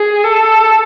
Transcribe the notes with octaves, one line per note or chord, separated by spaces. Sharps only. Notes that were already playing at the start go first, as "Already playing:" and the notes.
Already playing: G#4
A4